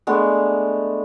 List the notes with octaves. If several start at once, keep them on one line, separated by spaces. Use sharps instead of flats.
G#3 A3 B3 D4